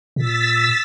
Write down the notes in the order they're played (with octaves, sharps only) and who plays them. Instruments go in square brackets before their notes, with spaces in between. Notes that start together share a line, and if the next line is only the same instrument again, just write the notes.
[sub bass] A#2 [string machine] E6 A6 B6